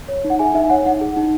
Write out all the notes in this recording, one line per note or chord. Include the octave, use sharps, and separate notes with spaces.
C#5
D#4
F#5
G#4 E5 G#5
D#4 E5
G#5
C#5 F#5
D#4 F#5
G#4
D#4